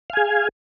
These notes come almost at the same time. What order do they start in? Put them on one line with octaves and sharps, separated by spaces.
F5 G#5 G#4